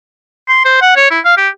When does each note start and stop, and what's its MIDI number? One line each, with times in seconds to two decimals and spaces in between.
0.49 0.61 84
0.65 0.79 72
0.82 0.95 78
0.97 1.11 73
1.11 1.20 64
1.25 1.37 77
1.37 1.49 67